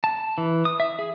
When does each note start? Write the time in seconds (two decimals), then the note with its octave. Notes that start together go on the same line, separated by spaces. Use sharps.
0.04 A5
0.38 E3
0.65 D#6
0.80 E5
0.99 G#4